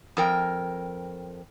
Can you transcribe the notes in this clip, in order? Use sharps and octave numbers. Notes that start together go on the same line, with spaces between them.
F2 A#4 G5